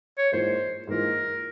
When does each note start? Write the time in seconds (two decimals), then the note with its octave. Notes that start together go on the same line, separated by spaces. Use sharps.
0.18 C#5
0.32 G#2 E3 A#3 F4 C5
0.87 G#2 E3 A#3 F4 A#4